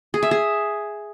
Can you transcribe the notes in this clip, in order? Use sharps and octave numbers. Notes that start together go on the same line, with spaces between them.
G#4
E5
G#4